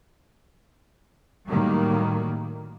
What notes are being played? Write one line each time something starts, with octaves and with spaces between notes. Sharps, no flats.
A2 D#3 F#3 G3 A#3